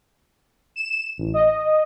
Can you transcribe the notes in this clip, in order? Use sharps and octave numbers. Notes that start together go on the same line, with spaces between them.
E7
A1
D#5